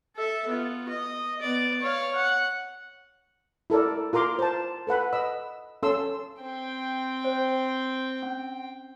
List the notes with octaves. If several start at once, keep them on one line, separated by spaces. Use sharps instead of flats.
A4 E5
B3 F4
D#5
B3 D5
C#5 F5
F#5
E4 A4 A#4 D5
F4 A#4 A#5 C6 D6
C5 A5
A4 B4 F#5 B5
D#5 B5 E6
C#4 A4 C6 E6
C4 G5
C5
C#4